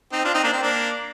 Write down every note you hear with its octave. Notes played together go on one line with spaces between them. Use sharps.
C4 D#4
D4 F4
C4 D#4
A#3 D4
C4
A#3 D4